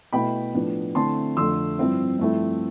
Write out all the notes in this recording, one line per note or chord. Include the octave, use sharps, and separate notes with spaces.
B2 A3 E4 G5 B5
A2 F3 B3 D4
D3 A3 C4 E4 A5 C6
F2 D3 A3 C6 E6
G2 F3 C4 E4
G2 F3 A3 C4 E4